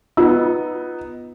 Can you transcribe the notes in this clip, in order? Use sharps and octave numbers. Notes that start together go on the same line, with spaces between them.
B3 D#4 F4 E6